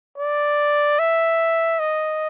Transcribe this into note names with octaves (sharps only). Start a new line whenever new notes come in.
D5
E5
D#5